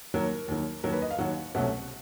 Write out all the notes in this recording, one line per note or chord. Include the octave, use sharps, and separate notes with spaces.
D#2 D#3 F#3 A#4
D#2 D#3 F#3
D#2 D#3 F#3 A#4
B4
D#5
F5
D#2 D#3 F#3 F#5
C2 B2 F#3 A3 C#4 F#5